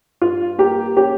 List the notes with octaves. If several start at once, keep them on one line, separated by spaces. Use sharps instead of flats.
G2 F4
A#3 G4
C#4 G4